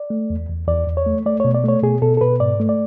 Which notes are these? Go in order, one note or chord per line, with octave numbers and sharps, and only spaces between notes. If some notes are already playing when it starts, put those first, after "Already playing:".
Already playing: D5
A3
E2
E2
E2 D5
E2
C#5
A3
A3 D5
B2 C#5
D5
A3 C#5
B2 G#4
B2 A4
A4
B2 B4
G#2 D5
A3
D5